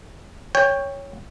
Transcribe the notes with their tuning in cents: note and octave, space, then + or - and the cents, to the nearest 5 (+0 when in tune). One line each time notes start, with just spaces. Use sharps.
C#5 +0 G5 +20